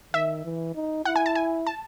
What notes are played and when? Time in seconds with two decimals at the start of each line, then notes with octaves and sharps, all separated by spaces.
0.14 D#3 E5
0.45 E3
0.75 D#4
1.05 E4 F#5
1.16 G#5
1.26 A5
1.35 G#5
1.67 A5